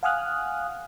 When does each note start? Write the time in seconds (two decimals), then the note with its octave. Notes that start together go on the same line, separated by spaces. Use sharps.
0.03 F5 F#5 G#5 D#6 F6 F#6